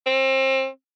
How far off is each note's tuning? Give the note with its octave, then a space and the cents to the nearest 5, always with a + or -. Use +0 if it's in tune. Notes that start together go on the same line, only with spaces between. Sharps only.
C4 +30